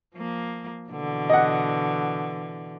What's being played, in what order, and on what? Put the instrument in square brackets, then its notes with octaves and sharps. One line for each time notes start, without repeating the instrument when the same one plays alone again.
[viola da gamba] F3 A#3
B2 D3 E3
[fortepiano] D#5 F#5